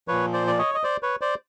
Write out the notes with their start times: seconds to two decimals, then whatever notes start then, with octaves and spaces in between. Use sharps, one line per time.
0.08 A#2 F3 B4 C#5
0.33 C5 D5
0.47 D5
0.58 C#5 D#5
0.75 D#5
0.84 C5 D5
1.02 B4 C#5
1.21 C5 D5